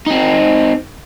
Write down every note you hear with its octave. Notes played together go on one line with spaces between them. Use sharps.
C4 D#4